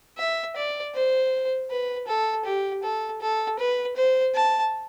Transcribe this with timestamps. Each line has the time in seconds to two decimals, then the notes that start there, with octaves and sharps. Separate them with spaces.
0.18 E5
0.56 D5
0.95 C5
1.70 B4
2.07 A4
2.45 G4
2.83 A4
3.21 A4
3.59 B4
3.96 C5
4.35 A5